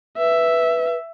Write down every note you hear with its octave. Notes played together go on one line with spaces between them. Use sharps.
B4 E5